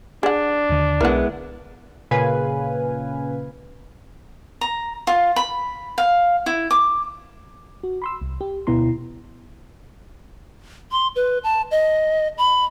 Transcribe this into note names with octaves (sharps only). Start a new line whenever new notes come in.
D4 G#4 F#5
D#2 D3
B1 G#3 B3 E4 A#4 F#5
A#2 C#3 B4 F5 G#5
A#5
F4
B5
F5
E4
D6
F#4
B5 C6 E6
C2
G4
D2 B2 B3 E4 A#5 C6
C6
B4
A5
D#5
B5